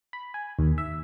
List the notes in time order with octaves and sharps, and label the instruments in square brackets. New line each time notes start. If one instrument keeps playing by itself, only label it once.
[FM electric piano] B5
G#5
D#2
E5